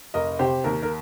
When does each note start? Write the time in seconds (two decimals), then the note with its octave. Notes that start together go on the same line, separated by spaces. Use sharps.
0.14 F1 A#4 D#5
0.39 C3 G4 C5
0.64 D#2 A#4
0.83 A#4